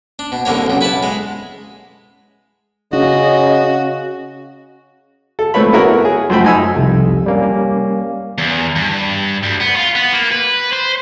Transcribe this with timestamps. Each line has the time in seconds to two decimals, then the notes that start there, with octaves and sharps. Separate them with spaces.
0.19 D4
0.32 B2
0.45 C2 D3 A#3 C#5
0.66 B1 C#3
0.81 E4 B4 F#5 A5
1.03 G#3
2.93 C#3 C#4 F#4 D#5
5.39 A4
5.54 A#2 A3 C4 B4 C#5 B5
5.72 B3 C#4 E4 F#4 A#4 C#5
6.05 G#4
6.30 F#2 F3 A3 C5 G5 B5
6.44 D#4 G#5 E6
6.75 C2 F2 C3
7.26 G3 A#3 C#4
8.38 E2
8.76 G2
9.43 D2
9.60 B3
9.76 F4
9.95 B3
10.13 A#3
10.32 B4
10.73 C5